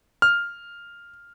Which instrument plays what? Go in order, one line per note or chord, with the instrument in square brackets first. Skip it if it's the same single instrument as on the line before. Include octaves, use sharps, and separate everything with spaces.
[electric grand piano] F6